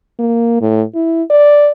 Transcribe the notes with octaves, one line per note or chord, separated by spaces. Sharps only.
A#3
A2
E4
D5